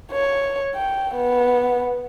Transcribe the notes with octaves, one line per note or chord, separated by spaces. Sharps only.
C#5
G5
B3